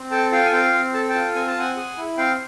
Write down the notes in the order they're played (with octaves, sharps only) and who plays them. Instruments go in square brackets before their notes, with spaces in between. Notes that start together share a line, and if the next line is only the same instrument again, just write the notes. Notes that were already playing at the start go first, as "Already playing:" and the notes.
Already playing: [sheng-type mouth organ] C4
A4 G5 A5
F4 F5 G5
G#5
C4 F5 G5
C4
A4 A5
G5 A5
F4
C4 G#5
A5
C4 F#5 G#5
G#4
E4
C4 F5 G5